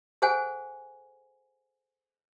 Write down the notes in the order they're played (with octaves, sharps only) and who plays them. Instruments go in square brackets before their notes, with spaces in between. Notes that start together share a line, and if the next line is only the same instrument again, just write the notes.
[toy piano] G#4 A4 C5 F#5 G#5